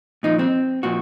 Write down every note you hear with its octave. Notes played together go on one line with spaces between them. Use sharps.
A#2 F3 D#4
C4
A#2 F3 F#4